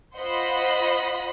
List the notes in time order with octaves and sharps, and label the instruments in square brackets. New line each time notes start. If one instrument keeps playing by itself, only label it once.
[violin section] F4 C5 D#5 F#5 B5